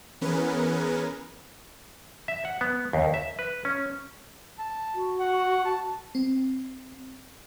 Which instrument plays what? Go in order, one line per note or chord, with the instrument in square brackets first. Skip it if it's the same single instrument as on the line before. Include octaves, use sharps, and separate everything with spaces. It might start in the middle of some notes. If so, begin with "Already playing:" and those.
[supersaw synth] E3 B3 C#4 G#4 A#4 B4
[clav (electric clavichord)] E5
F#5
B3
D#2
E5
B4
C#4
[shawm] A5
[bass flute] F#4
[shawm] F#5
A5
[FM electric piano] C4